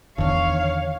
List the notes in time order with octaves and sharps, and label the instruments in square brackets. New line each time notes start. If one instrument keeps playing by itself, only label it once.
[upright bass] E2 D#3 [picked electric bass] D3 [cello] C#5 F5